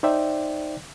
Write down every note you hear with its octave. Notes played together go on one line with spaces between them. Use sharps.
D#4 C5 D5 E5 G5